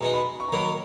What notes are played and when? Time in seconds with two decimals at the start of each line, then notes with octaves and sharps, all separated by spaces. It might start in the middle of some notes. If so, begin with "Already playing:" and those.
0.01 B2 G#3 D#4 A#5
0.14 B5
0.40 C#6
0.48 A#5
0.52 D#3 F#3 A#3 B5